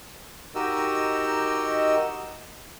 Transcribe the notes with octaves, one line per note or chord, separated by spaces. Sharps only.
D#4 F#4 G4 A#4 D#5 E6